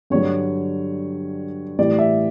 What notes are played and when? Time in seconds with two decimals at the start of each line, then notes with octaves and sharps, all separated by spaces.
0.10 G2 D3 F#3 C#5
1.79 A2 E3 G3 D5
1.98 E5